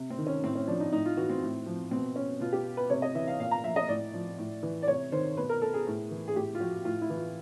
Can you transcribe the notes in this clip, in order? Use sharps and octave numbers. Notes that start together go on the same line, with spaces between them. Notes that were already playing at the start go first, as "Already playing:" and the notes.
Already playing: C3
C4
D#3
C#4
A2 C4
C#4
F3 D4
D#4
A2 D#4
F4
E3 F#4
C4
A2
F3
B2 C4
C#4
B2 F4
G4
B4
C3 C#5
D#5
E3 E5
F5
A#2 F5
A#5
F3 E5
D#5
A2 D5
F3
A2
E3
D5
C3 C#5
D#3 C5
B2 B4
A#4
A4
G#4
A2
E3
G#4
A2 G4
F4
F3 F#4
A2 F4
E4
E3
F4